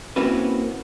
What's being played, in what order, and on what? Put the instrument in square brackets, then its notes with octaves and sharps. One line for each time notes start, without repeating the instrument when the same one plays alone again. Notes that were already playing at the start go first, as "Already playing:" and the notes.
[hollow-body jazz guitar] A#3 C4 C#4 E4 F#4 B4